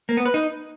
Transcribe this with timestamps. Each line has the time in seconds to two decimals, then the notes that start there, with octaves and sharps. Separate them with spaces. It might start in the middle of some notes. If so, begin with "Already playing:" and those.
0.09 A#3
0.17 B3
0.26 B4
0.34 D#4